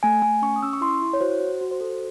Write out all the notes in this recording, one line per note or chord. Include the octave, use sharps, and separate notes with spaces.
A3 G#5
A3 G#5
C#4 C#6
D#6
C#4 E6
C#6
E4 C6
E4
C#5
F#4 C5
F#4
F#4
C5
F#4 A4